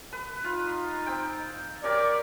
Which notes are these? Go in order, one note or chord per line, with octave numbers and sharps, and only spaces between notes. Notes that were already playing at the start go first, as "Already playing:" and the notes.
B4
D#4 F4
C4 G5
G4 A#4 C#5 D5